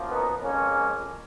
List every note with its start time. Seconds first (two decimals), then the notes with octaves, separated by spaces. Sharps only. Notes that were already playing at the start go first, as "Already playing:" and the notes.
Already playing: F#2 F3 A#3
0.09 B3 D#4
0.42 F2 F3 G#3 A#3 C#4